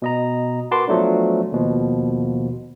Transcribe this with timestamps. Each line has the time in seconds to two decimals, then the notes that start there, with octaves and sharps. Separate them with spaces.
0.02 B2 D#5 A#5
0.71 F#4 A#4 B4 A5 C6 D6
0.88 F3 F#3 A3 B3 D4
1.52 D#2 B2 F3